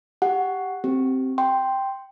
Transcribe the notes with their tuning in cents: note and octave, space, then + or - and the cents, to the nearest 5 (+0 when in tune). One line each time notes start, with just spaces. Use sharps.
G4 +0 F#5 +0
C4 +0 G4 -20
G5 +0 C6 +0